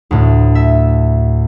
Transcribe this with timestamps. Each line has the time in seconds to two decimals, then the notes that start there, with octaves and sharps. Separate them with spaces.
0.11 D2 A2
0.55 E5